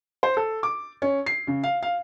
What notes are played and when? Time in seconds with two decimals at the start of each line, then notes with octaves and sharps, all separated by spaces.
0.23 C5
0.37 A4
0.63 D6
1.02 C#4
1.26 C7
1.47 C#3
1.63 F5
1.83 F5